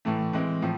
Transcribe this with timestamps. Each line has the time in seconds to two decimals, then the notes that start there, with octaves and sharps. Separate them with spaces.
0.05 A2 E3 A3
0.33 E3 G#3 C4
0.62 A2 F3